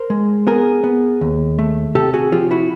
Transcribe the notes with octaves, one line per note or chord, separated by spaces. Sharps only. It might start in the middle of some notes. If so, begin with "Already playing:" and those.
Already playing: A#4 C5
G#3
B3 G#4 A#4
B3
D#2
A3
C3 G4 A4
F#4 G#4
F3 F4 G4
E4 F#4